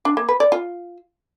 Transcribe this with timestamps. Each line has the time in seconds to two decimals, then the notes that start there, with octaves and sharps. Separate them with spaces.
0.05 D4
0.17 A#3
0.29 B4
0.40 D5
0.52 F4